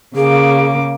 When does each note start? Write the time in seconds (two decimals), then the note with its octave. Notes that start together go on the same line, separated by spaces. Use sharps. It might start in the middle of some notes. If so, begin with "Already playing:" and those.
0.16 C#3 A#3 G#4 D6